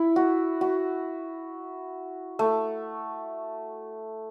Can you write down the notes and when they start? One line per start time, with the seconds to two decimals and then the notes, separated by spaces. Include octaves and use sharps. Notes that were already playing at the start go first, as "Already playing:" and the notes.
Already playing: E4
0.16 F#4
0.61 F#4
2.39 A3